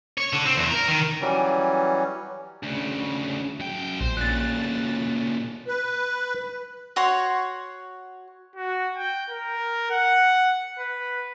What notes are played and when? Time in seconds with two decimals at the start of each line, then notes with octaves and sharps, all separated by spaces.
0.18 C#5
0.33 D3
0.45 C4
0.57 E2
0.71 A#4
0.88 D#3
1.21 E3 F#3 G3 C#4
2.63 D2 C#3
3.60 F#2 G5
4.01 A#1 C5
4.17 A#2 C#3 F#6 A6
5.67 B4
6.96 F#4 C#5 C6
8.56 F#4
8.97 G5
9.30 A#4
9.91 F#5
10.79 B4